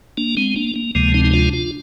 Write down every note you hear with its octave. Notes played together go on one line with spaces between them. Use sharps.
A#3 D4
G#3 C4
A#3 D4
A#3
D2 C3 F3 G#3 A#3
C4 D#4
D#4
D4 F4
D4 F4